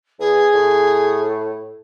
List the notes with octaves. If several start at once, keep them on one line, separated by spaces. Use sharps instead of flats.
E2 G#4
A2